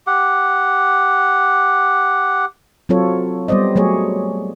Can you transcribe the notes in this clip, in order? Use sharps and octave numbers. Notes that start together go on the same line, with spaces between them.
G4 F#5
F#3 C4 F4 A4 C#5
G3 B3 C5 D5 D#5
F#3 A3 G#4 C#5